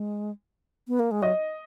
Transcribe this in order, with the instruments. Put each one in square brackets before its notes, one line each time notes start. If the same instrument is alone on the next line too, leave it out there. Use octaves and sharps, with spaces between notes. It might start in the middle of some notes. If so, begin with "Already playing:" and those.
Already playing: [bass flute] G#3
B3
A#3
G#3
[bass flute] F#3 [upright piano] D#5